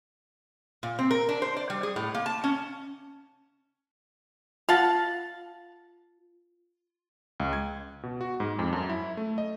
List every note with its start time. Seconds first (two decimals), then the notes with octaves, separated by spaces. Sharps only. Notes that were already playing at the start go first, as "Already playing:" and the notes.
0.83 A#2
0.99 C4
1.11 A#4
1.29 D4
1.42 C5
1.57 D5
1.70 G3
1.83 G#4
1.96 A2
2.15 A#3
2.26 A5
2.44 C#4
4.69 F4 F5 F#5 A5
7.40 C#2
7.53 G#6
8.03 B2
8.21 F#4
8.40 G#2
8.59 F2
8.73 F#2
8.89 E4
9.17 A3
9.38 D#5